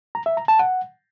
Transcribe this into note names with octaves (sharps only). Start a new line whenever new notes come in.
A#5
E5
A#5
A5
F#5